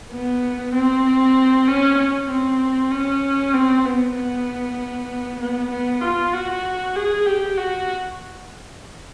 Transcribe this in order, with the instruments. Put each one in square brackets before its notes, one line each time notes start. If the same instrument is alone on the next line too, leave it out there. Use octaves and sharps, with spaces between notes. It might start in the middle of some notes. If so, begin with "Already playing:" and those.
[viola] B3
C4
C#4
C#4
C4
C#4
C4
B3
B3
B3
B3
F4
F#4
G#4
G4
F#4